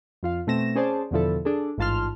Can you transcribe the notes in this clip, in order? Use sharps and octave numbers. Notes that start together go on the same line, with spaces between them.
F2 F4 F5
B2 A3 C4 A#6 E7
C#4 G#4 C5 D5 A5
E2 B2 D3 F3 E4 A4
D4 G#4 A4
A1 G#2 F4 A5 C6 F6